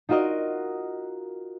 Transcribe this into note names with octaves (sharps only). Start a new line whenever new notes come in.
D#4 F4 F#4 A#4 D#5